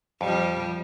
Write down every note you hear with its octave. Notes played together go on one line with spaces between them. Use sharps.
F2 F3 G3